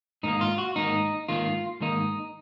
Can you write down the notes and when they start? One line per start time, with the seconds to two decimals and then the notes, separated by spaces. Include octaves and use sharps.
0.23 G#2 D#3 A#3 D#4
0.41 F4
0.58 F#4
0.76 G#2 D#3 A#3 D#4
1.28 G#2 D#3 A#3 F4
1.81 G#2 D#3 A#3 D#4